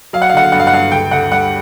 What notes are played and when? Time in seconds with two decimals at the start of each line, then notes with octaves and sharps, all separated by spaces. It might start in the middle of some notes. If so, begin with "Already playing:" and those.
0.13 F#3 F5
0.22 F#5
0.30 F5
0.33 D3 F#5
0.44 F5
0.52 G2 F#5
0.60 F5
0.67 F#5
0.72 G2 F5
0.92 D2 G5
1.11 D2 F#5
1.32 G3 F#5